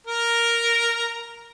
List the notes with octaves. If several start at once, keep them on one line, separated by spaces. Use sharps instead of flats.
A#4 A#5